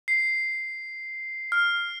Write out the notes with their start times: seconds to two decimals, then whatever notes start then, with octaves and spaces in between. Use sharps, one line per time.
0.08 C7
1.52 F6